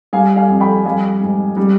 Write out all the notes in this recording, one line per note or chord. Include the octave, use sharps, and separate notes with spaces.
G3 F5 G#5
F5 G#5
F2
G5 B5
G3 F5 G#5
G#2
G3